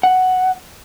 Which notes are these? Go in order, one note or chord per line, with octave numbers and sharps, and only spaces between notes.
F#5